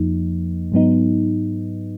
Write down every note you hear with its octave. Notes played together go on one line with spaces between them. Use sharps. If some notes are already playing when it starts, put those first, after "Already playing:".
Already playing: F2 F3 A#3 D#4
G#2 F#3 B3 D#4